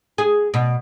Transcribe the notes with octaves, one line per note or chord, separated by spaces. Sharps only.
G#4
B2